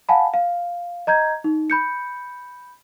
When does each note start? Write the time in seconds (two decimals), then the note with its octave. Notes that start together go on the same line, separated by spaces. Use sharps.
0.09 F5 F#5 G#5 A5 B5
0.34 F5
1.07 D#5 A#5 G6 G#6
1.44 D#4
1.70 B5 G6 C#7